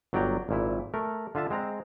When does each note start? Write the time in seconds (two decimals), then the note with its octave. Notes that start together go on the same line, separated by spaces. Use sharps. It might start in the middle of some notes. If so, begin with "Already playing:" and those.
0.13 G1 F#3 D5 G5 A#5
0.49 G#1 A#2 E4
0.94 A3 A#4
1.35 D3 F4 E5 A5
1.50 G#3 C4 A#5